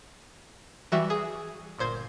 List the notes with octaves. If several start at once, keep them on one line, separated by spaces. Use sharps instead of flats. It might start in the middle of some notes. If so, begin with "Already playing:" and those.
E3 G3 F#4 E5
G#4
G1 A#2 C5 G#6